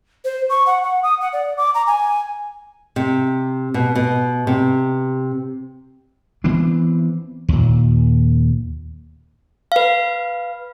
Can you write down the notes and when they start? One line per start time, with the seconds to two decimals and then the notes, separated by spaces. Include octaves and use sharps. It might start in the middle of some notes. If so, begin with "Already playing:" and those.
0.25 C5
0.49 C#6
0.66 F#5
0.83 F#5
1.03 D#6
1.21 F#5
1.33 D5
1.57 D6
1.75 A#5
1.87 G#5
2.96 C3
3.74 B2
3.95 B2
4.47 C3
6.44 E3 B3 C4 D4
7.49 D#2 A#2
9.72 B4 F5